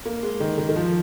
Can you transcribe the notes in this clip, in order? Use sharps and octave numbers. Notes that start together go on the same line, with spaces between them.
A#3
G#3
D#3
D#3
D#3
F3